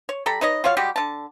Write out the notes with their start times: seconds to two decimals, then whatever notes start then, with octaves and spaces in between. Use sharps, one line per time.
0.09 C#5
0.26 G3 A4 A#5 B5
0.41 D#4 B4 C#5 D#5
0.64 F4 F#4 C#5 F5
0.77 G3 G#3 F#4 G4
0.96 D3 A5